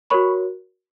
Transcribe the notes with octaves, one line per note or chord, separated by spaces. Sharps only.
F#4 A#4 C#5 B5 C#6